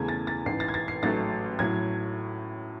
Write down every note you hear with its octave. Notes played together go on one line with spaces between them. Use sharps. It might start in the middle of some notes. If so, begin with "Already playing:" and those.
Already playing: E2 C#3 E3 A3 G#6
A6
A6
A1 G#2 E3 C7
A6
G#6
A6
C7
A1 G#2 F#3 A3 A6
A2 F#3 G#6